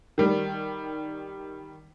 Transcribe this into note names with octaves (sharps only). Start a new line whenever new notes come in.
D#3 G3